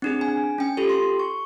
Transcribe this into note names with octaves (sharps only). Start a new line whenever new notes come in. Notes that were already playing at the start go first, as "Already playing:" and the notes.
C4 D4 G#4
G#5
C#4 G5
F4 G4 A4
C6
C#6